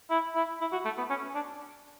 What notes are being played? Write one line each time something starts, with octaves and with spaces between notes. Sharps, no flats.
E4
E4
E4
F#4
A3
B3
C#4
D4